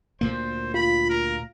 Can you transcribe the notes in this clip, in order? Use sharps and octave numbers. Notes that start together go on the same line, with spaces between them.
D2 A#2 A#3 C5
F4 B5
A#4